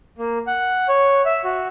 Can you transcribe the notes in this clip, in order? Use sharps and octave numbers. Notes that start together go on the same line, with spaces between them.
A#3
F#5
C#5
E5
F#4